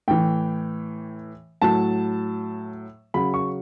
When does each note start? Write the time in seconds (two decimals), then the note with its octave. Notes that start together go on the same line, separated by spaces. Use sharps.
0.08 A2 E3 G5
1.62 A2 F#3 A5
3.14 C#3 F#3 B5
3.34 C#6